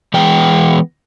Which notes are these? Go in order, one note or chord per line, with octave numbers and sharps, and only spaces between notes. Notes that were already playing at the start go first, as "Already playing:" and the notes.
E3 G#3 B3 G5